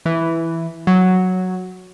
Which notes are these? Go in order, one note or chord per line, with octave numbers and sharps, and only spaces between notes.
E3
F#3